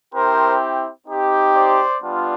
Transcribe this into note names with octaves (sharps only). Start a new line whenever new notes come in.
C4 E4 G4 A#4 C5
C4 D#4 G4
C5 D5
G3 B3 D4 F4